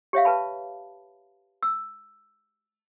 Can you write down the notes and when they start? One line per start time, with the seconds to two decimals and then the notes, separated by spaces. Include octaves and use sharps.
0.13 G4 C#5 E5 F5
0.25 B4 A5 B5
1.63 E6